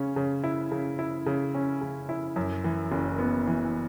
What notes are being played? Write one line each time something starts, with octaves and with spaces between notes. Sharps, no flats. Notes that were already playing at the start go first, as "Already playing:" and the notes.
Already playing: C#3 C#4
C#3
E4
C#3
E4
C#3
C#4
C#3
E4
F#2
E3
F#1
B3
E3